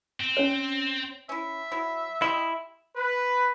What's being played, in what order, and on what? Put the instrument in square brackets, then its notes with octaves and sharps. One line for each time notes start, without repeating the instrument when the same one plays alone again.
[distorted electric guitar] C4
[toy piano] C#4 C#5
[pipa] C#4 E4 [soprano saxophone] E5
[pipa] F#3 E4
[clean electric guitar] E4 [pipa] G4 D#5 C6
[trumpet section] B4